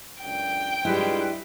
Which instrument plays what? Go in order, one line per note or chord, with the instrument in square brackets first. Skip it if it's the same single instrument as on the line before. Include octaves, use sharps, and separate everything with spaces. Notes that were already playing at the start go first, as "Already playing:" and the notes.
[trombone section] C#2 F#2 D4 [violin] G5
[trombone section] G2 G#3 F4 [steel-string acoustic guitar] G3 E4 [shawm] B4